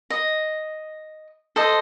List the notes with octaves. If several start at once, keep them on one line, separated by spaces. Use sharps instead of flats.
D#5
A4 C5 D#5